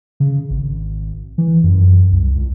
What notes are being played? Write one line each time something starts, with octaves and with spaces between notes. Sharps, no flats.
C#3
G#1
E3
F#2
C2
C#2